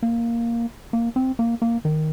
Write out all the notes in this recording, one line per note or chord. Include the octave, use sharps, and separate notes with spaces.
A#3
A#3
C4
A#3
A#3
D#3